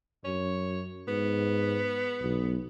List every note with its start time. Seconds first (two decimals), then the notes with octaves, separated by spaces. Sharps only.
0.24 F#2 C#5
1.08 G#2 B3
2.21 B1